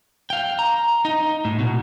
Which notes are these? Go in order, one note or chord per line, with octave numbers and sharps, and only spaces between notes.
F5 G5
A#5
D#4
A2
B2